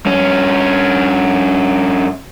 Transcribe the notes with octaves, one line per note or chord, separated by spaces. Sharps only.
G2 C#4